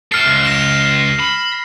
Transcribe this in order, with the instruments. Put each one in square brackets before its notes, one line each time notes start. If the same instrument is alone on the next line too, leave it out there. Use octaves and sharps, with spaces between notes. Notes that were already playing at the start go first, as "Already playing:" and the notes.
[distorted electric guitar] E4 A4 [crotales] F6 C7
[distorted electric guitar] C#2
[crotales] A#6 E7
[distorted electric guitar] B5